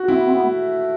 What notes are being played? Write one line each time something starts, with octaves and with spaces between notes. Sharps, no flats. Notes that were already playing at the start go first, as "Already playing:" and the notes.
Already playing: F#4
C4 E4
B3
C4
B3
A3